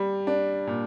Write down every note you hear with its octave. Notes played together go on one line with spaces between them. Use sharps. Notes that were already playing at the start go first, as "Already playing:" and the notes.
Already playing: G3
D4
A#2